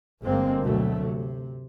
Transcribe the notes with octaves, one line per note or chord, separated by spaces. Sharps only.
G1 G#3 A#3 C4
D2 B2 F#3 A3
C3